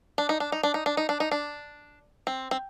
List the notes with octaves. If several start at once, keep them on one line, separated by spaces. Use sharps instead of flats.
D4
D#4
D4
D#4
D4
D#4
D4
D#4
D4
D#4
D4
C4
C4